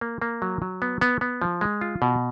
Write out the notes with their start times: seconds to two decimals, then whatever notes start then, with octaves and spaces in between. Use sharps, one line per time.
0.01 A#3
0.22 A#3
0.42 F#3
0.62 F#3
0.82 B3
1.01 B3
1.21 B3
1.42 F3
1.61 G#3
1.81 F4
2.02 B2